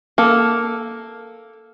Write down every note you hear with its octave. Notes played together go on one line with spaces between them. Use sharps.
A#3 A4